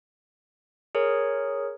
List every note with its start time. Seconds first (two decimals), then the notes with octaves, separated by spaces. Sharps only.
0.95 G#4 A#4 C#5